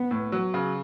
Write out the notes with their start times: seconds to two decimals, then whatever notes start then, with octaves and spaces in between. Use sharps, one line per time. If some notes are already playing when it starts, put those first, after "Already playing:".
Already playing: B3
0.11 A2
0.32 F#3
0.54 C#3